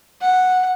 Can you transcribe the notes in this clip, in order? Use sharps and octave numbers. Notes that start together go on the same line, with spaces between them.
F#5